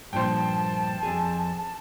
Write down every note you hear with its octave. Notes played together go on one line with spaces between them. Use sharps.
G2 A#2 F3 C5 G5 A5
F2 G#4